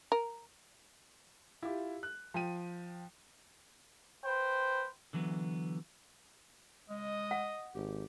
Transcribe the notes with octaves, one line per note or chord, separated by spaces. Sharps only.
A#4
E4 F4 G4
F#6
F3 G5 D#7
B4 C5 G5
D3 E3 F#3 B3
G#3 D#5
F#5
G#1 G4